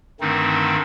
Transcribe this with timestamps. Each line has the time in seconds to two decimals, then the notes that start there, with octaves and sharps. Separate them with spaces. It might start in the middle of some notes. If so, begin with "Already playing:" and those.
0.21 G2 D3 D#3 A3 C4 D#4